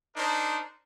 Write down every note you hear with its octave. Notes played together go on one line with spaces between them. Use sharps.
D4 D#4 A#4 C5